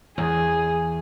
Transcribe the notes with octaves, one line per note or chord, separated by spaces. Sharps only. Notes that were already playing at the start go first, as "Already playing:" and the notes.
E2 G#4